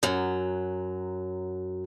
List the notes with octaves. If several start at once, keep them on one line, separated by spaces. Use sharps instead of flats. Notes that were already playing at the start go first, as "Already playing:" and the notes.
F#2 F#3